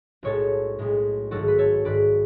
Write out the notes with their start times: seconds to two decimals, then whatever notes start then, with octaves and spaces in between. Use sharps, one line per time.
0.23 B1 A2 G#3 A4 C#5
0.79 B1 A2 G#3
1.31 G#1 G#2 F#3 F#4 A4
1.48 B4
1.58 A4 C#5
1.85 G#1 G#2 F#3 B4 D5